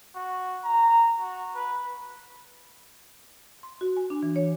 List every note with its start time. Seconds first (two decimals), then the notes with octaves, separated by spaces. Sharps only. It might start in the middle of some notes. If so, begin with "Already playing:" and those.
0.15 F#4
0.64 A#5
1.20 F#4
1.55 B4
3.63 C6
3.81 F#4
3.97 G#5
4.10 D4
4.23 E3
4.36 C#5